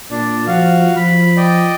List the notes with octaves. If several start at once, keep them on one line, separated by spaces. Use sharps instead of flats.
A#2 D4
F3 F#4 F5
F3 B5
D5 D#5 G5